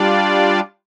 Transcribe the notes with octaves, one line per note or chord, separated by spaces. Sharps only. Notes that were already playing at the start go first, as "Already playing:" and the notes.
Already playing: G3 D4 F4 D5